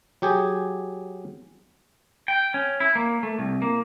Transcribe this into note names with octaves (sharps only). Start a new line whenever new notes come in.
F#3 G4 G#4
G5
C#4
E4
A#3
A3
C2
A#3